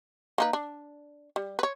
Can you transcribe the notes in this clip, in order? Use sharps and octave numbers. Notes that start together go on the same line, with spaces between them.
A#3 D#4 B4
D4
G3
B4 C#5